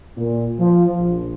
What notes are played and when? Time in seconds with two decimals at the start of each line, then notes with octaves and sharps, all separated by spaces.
0.17 A#2
0.60 F3
0.99 A#1